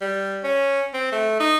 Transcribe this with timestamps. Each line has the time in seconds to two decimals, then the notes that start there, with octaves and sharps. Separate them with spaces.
0.01 G3
0.44 C#4
0.94 C4
1.12 A3
1.40 D#4